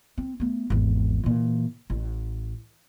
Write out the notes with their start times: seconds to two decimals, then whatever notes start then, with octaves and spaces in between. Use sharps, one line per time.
0.18 C4
0.40 A3 B3
0.70 G#1 E2
1.24 A#2 E3
1.90 A1